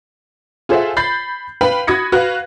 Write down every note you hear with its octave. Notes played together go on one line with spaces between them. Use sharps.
F4 G#4 A4 C5 E5 F#5
B5 G6 A6 C7
B4 F5 G5 B5
F#4 B5 D#6 G#6 A#6 C#7
F#4 B4 F5 F#6